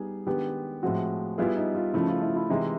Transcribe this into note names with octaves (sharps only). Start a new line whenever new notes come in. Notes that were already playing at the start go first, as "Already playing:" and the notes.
Already playing: G3 B3 D#4 G#4
D#3 G#3 B3 D4 G4
A2 F3 G#3 C4 F#4
G3 B3 E4 F4 G#4
D#4
F4
C#3 F3 A3 E4
F4
E4
E4
C3 E3 G#3 D#4